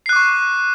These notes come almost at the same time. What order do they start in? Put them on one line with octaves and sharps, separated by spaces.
C7 F#6 D6 C#6